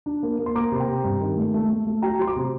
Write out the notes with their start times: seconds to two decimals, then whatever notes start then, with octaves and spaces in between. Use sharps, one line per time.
0.06 D4
0.23 A#3
0.39 A#3
0.46 C6
0.55 A#3 A#5 D6
0.72 C3 C6
0.80 G5 A#5
0.88 C3
1.04 G2
1.21 D#3
1.37 A3
1.54 A3
1.70 A3
1.87 A3
2.02 F#3 G5 A#5
2.19 F#3 C6
2.27 A#5 D6
2.36 C3